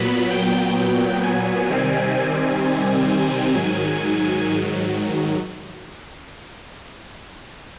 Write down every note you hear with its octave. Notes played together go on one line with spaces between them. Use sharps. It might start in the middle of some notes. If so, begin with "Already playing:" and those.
Already playing: A#2 F#3 B3 B5
G5
G5
G#5
C3 D#3 G3 C4
G#5
G#5
G#2 D#3 F#3